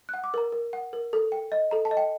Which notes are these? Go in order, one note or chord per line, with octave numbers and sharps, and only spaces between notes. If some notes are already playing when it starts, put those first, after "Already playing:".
F#5 F#6
D6
A#4 A#5
A#4
F#5
A#4
A4
G5
D#5
A4 A#5
A5
D#5
G5